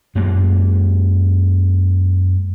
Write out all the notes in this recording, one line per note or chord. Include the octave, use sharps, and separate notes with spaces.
F#2 G#3 A#3